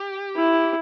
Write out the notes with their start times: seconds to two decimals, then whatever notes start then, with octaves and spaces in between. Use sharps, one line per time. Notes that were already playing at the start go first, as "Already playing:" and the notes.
Already playing: G4
0.36 E4